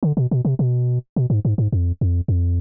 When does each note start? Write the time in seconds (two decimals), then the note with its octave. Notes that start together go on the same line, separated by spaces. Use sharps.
0.03 D3
0.17 B2
0.31 B2
0.45 C3
0.59 B2
1.16 B2
1.30 G#2
1.45 G#2
1.58 G#2
1.72 F2
2.01 F2
2.28 F2